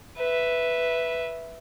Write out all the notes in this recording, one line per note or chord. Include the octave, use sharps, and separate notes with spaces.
B4 E5